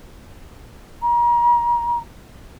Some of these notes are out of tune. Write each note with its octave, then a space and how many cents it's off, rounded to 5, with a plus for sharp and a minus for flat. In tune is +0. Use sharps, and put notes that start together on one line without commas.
A#5 +35